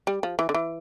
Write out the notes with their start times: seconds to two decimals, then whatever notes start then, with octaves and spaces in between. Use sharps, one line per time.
0.07 G3
0.23 F3
0.39 E3
0.49 D3
0.54 E3